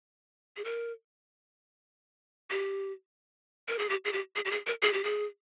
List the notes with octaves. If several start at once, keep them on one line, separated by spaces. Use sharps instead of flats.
G#4
A#4
G4
A#4
G#4
G4
G#4
G4
G#4
G4
G#4
A#4
G#4
G4
G#4